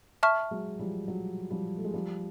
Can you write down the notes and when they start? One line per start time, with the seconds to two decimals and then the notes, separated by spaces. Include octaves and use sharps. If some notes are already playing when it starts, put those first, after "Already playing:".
0.23 E5 A5 C#6 F6
0.51 F#3 G#3
0.79 F3 G3
1.08 F#3
1.50 F3 G3
1.76 A3
1.84 G#3
1.94 F3 G3